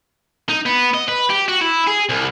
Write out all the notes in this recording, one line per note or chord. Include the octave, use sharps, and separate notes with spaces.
D#4
B3
D#5
B4
G4
F#4
E4
G#4
C2